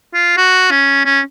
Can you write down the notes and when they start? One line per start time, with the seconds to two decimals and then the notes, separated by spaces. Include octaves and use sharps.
0.14 F4
0.37 F#4
0.71 C#4
1.05 C#4